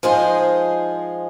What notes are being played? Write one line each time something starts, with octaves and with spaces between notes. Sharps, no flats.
F3 G#3 D#4 G#4 C5